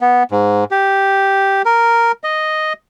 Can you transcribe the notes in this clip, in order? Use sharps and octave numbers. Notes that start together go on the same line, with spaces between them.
B3
G#2
G4
A#4
D#5